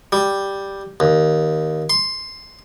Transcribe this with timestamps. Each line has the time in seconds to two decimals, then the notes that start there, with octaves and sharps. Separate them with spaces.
0.12 G3
1.00 D#2
1.90 C6